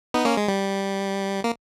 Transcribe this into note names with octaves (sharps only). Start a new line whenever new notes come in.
B3 D#4
A#3 C#4
G#3
G3
A#3